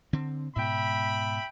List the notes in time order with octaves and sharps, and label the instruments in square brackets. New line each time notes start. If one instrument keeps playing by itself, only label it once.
[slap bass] D3 C4
[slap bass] G#2 B2 [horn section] E5 G5 B5